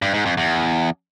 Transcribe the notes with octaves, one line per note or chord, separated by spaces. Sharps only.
G2
G#2
F2
E2